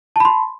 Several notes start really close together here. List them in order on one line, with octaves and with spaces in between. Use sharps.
A5 B5 C6